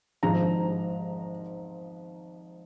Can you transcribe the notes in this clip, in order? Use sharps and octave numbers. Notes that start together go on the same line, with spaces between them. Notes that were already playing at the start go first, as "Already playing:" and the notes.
G#1 G#2 F3 A#5